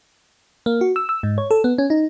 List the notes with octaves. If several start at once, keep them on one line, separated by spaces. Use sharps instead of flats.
A#3
F#4
E6
E6
G#2
C#5
A4
B3
C#4
D#4